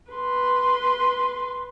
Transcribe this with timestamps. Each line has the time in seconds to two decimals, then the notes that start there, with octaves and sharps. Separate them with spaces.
0.11 B4 C6